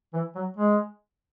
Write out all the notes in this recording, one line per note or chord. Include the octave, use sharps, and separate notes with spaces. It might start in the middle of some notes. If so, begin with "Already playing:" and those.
E3
F#3
G#3